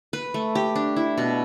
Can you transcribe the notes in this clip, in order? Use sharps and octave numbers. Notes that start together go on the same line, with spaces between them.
B4
A3
G4
D4
E4
B2